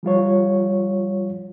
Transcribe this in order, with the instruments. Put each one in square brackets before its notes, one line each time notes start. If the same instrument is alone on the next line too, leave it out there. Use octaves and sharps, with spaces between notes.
[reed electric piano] F3 G3 F4 C#5